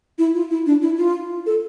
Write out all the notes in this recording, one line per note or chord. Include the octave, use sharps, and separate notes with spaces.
E4
F4
E4
D4
E4
F4
A4